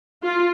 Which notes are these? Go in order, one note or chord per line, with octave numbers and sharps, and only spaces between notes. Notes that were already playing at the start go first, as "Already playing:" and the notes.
F4